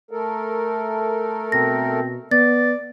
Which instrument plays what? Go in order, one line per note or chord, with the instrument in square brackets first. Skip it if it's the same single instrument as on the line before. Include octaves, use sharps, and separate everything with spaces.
[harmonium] A3 A4 A#4
[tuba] B2 [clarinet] C4 [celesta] A#6
[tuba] B3 [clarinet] D5 [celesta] A6